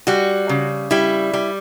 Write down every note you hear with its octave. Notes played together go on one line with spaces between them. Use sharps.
G3 F#4
C#3
G3 E4
G3